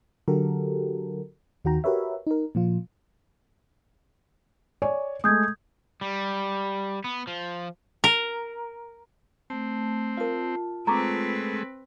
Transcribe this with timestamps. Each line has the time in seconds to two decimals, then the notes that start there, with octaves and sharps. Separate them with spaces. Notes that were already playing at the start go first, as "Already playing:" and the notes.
0.28 D3 F#3 F#4 G4 A4 A#4
1.65 D#2 D#3 F#4 G5 A#5
1.84 F#4 G4 A#4 B4 C#5 E5
2.27 D#4 A#4
2.55 A#2 F3 F4
4.82 C#5 D5 G#5
5.24 G#3 A3 D#6 G6 G#6
6.01 G3
7.04 B3
7.27 F3
8.04 A#4
9.50 A3 C4 A5
10.17 F4 A#4 F5 A5
10.87 G#3 A3 C4 B4 A#5 C#6 D6